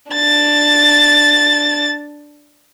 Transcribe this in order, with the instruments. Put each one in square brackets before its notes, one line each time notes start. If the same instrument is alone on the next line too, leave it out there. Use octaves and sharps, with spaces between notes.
[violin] D4 A6